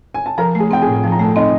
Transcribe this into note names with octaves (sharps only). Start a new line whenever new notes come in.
G#5
A5
F3 A#4 A#5
A3 G#4 G#5
C4 G5
G#4 G#5
A2
F3 A5
A#5
A3 A4 A5
C4 D#4 D#5